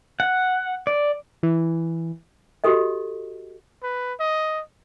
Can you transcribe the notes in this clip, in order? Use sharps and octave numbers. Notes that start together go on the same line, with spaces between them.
F#5
D5
E3
F#4 G4 A4 D#5
B4
D#5